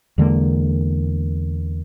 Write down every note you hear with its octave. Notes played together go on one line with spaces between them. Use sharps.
E2 D3 G#3 A#3